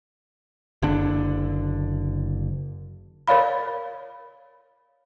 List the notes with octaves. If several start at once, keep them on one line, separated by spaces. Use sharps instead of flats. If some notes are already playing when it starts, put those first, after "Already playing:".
F#1 D3 D4
A#4 C#5 D5 F5 B5